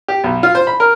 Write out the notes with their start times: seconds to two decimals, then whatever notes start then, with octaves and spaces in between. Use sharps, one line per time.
0.08 G4
0.24 B1
0.43 F4
0.55 C5
0.67 B5
0.80 A#4